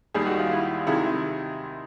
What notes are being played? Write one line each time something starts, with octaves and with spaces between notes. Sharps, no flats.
D#2 D#3 G3 G#4
F#4
F4
E4
C3 D#3 G#3 E4